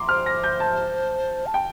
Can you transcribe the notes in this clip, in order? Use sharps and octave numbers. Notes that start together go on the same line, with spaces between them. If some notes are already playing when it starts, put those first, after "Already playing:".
Already playing: A#5 C6 D6
C5 F6
A#6
G6
A5
A5
G5